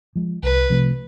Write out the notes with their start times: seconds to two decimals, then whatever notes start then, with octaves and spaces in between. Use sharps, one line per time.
0.15 F3 G#3
0.43 C2 B4
0.70 C3 F3 A3